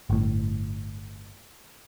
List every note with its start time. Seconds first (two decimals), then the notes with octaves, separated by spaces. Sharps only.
0.10 G1 A2